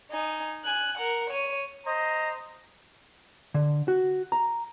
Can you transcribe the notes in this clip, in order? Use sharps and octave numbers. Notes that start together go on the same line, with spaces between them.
D#4 G#5
G#5 F#6
A#4 F#5
C#5 D#7
C5 D#5 A#5
D3
F#4
A#5